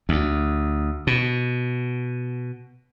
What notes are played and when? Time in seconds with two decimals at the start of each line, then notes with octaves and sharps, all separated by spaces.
0.09 D2
1.07 B2